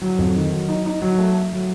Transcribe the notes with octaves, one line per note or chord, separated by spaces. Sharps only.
F#3
F2
D#3
F#3
D#4
D#4
F#3
A3
A3
F#3